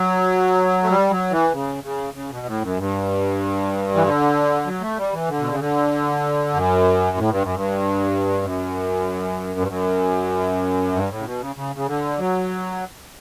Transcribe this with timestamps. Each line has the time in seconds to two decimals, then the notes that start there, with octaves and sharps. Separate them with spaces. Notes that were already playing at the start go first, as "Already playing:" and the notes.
Already playing: F#3
0.83 A3
0.90 G3
1.10 F#3
1.31 E3
1.52 C#3
1.84 C#3
2.14 C#3
2.31 B2
2.46 A2
2.62 F#2
2.78 G2
3.95 E3
4.03 D3
4.66 F#3
4.81 A3
4.98 G3
5.13 E3
5.28 D3
5.39 B2
5.49 C#3
5.60 D3
6.54 F#2
7.17 A2
7.30 G2
7.42 F#2
7.55 G2
8.42 F#2
9.60 G2
9.67 F#2
10.93 G2
11.09 A2
11.19 C#3
11.25 B2
11.40 C#3
11.56 C#3
11.76 C#3
11.87 D3
12.19 F#3